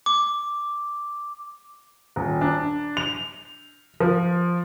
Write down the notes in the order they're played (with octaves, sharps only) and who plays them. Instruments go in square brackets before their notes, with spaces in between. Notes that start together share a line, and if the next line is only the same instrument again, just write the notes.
[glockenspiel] D6
[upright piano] D#1
D4
F7
F3